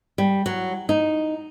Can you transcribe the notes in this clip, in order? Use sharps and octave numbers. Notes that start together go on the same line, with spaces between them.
G3
F#3
D#4